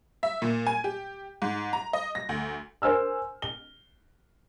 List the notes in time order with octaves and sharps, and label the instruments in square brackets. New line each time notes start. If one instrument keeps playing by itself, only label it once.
[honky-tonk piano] E5
A#2
G#5
G4
G#2
A#5
D#5
A#6
D2
[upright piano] A#4 C5 G#5 E6 F6
G7